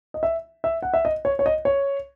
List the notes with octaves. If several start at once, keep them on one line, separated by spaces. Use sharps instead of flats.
D#5
E5
E5
F#5
E5
D#5
C#5
C#5
D#5
C#5